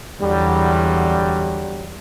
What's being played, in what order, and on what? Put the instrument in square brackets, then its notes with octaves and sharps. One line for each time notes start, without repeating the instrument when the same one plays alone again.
[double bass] E2 [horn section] D3 F#3 G3